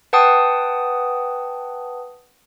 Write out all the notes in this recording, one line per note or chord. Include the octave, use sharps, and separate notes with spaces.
B4 F#5 G5 A5 D#6